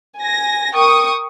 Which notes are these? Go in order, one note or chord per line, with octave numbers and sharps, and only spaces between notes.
G#5 A#6
A#4 G5 C#6 D#6